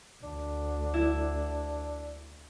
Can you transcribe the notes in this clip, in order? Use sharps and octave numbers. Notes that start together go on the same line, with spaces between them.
D2 D4
E4